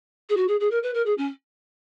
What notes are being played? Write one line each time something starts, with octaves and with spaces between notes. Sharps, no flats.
G#4
F#4
G#4
G#4
A#4
B4
A#4
G#4
C#4